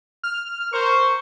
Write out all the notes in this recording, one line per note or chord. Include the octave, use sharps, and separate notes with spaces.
F6
A#4 C5 C#6